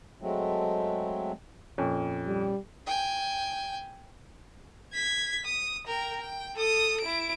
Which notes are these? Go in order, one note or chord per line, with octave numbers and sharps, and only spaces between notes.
F#3 G#3 A3 C4
F2 A#2 C#4
G3
G5 G#5
G#6 B6
D#6
A#4 G5
G5
A4 D#6
E4 D7